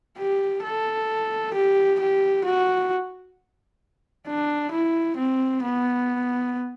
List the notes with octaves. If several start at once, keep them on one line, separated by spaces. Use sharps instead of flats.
G4
A4
G4
G4
F#4
D4
E4
C4
B3